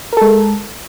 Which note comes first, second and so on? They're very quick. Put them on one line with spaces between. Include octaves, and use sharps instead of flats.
A#4 A4 G#3